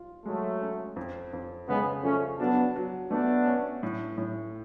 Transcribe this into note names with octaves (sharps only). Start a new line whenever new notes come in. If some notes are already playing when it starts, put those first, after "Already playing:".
Already playing: F4
F#3 G#3 A3
C#4
F2
F2
C#3 G#3 B3
F3 A3 C#4
F#3 B3 D4
F#3
A3 B3 D4
C#4
A2
A2